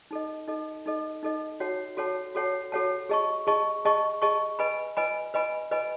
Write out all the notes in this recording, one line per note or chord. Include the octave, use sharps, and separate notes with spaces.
D#4 A4 D#5
D#4 A4 D#5
D#4 A4 D#5
D#4 A4 D#5
F#4 A4 C#5 F#5 A5
F#4 A4 C#5 F#5 A5
F#4 A4 C#5 F#5 A5
F#4 A4 C#5 F#5 A5
G#4 D#5 A5 C#6
G#4 D#5 A5 C#6
G#4 D#5 A5 C#6
G#4 D#5 A5 C#6
B4 D#5 G#5 B5
B4 D#5 G#5 B5
B4 D#5 G#5 B5
B4 D#5 G#5 B5